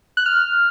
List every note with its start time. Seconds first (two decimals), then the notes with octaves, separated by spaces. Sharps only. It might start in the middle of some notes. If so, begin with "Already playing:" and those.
0.17 F#6
0.26 F6